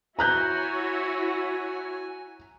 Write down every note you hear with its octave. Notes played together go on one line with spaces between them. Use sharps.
E4 F#4 C#5 G#5 A#5 F#6 G6